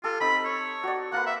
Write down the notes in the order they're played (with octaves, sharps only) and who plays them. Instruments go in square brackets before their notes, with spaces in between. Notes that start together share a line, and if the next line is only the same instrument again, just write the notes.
[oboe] F4 [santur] G4 A4
[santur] C4 D#4 [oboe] B5
[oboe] C#5
[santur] F#4 D5
[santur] A#3 A#4 B4 [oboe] F#5
[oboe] E5